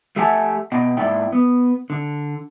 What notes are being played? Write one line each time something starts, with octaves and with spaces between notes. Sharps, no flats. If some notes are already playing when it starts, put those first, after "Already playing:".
A3 G4 E5 F#5 G#5 A5
B2 B3 D#5 G5
G#2 A#3 E4 D5 E5 G5
B3
D3